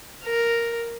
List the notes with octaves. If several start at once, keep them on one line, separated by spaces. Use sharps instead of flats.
A#4